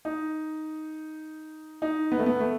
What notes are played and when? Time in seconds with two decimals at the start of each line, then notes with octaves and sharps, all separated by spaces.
0.05 D#4
1.82 D#4
2.12 B3
2.19 A3
2.26 B3
2.40 A3